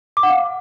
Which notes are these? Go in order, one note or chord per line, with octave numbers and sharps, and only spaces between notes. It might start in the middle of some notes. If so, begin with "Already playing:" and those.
D6
F#5
F5